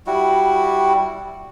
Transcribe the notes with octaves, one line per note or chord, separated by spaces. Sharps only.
G3 E4 F#4